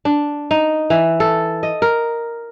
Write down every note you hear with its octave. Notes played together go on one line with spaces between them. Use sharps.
D4
D#4
E3
A4
D#5
A#4